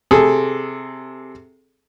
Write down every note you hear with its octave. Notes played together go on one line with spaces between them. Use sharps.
C3 G#4 A4